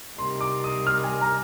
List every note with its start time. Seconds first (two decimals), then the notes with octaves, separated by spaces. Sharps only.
0.18 C3 G3 A#3 D#4 C6
0.41 D6
0.64 D#6
0.87 F6
1.04 G#5
1.21 A#5